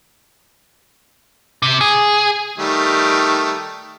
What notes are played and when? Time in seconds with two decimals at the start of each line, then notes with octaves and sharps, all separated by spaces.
1.62 C3
1.81 G#4
2.58 D#3 G3 A3